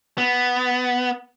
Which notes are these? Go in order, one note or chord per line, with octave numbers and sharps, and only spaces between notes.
B3